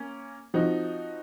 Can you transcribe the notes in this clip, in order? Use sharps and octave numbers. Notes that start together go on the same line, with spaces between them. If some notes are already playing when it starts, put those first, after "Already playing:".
Already playing: A#3 C#4
F3 C4 D#4 F#4